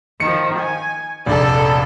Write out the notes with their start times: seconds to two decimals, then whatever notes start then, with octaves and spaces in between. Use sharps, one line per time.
0.20 D#3 F3 C#7
0.57 G#5
1.26 F1 A#1 A4 D5